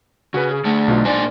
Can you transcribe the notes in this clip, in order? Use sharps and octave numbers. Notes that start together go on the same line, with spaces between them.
C#3 F#4 G#4 B4
G#4
D3 A3
B1 B2 F4
A#2 D4 C5 D5 G#5